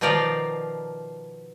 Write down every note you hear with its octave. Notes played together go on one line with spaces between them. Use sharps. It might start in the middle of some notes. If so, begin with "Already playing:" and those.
B2 D#3 F3 F4 D5 A#5